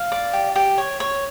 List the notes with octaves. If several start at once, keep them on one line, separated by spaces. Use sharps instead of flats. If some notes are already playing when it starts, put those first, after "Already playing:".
Already playing: F5
D5
G4
G4
C#5
C#5